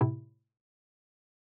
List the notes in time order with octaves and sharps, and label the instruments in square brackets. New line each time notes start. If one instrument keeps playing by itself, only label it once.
[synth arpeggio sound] A2 C3 E4